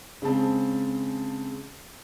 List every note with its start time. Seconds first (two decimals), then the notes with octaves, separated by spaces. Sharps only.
0.22 C#3 G#3 C4 A5